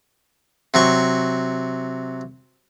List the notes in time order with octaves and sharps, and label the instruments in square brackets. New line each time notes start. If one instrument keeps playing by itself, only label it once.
[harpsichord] C3 F#3 C#6